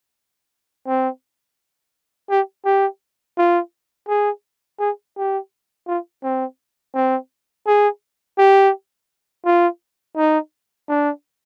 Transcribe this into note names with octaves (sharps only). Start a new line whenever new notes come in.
C4
G4
G4
F4
G#4
G#4
G4
F4
C4
C4
G#4
G4
F4
D#4
D4